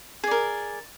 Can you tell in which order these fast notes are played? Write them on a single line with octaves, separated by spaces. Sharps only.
G#4 D5 A#4